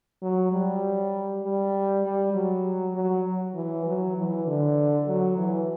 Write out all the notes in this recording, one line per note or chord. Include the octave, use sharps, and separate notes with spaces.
F#3
G3
G3
G3
F#3
F#3
E3
F#3
E3
D3
F#3
E3